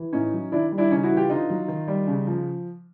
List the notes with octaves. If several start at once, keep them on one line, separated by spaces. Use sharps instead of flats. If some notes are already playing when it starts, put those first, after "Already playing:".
Already playing: E3
A2 C#4 D#4
F#3
D#3 D4 E4
G3
D4 E4
C#3 C#4 D#4
E4 F#4
E3
F4 G4
D3 D#4 F4
F#3
D#3
G3
C#3
F3